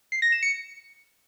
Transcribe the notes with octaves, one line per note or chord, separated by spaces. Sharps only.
C7
A#6
E7
C#7
C#7